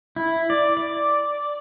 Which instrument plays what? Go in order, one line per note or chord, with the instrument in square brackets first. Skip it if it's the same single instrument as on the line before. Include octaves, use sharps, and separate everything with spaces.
[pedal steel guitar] E4
D5
D5